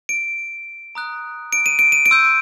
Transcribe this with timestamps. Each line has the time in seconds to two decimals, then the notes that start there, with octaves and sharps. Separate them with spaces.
0.09 D7
0.95 A#5 D#6 F#6
1.53 D7
1.66 D#7
1.79 D7
1.92 D#7
2.06 D7
2.11 C6 E6 G6